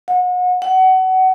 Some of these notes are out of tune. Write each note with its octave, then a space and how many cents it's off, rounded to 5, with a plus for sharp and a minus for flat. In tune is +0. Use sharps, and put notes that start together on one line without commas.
F#5 -35
F#5 +25